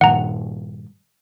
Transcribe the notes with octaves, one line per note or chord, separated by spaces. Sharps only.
G2 A#2 D#3 F#5 A#5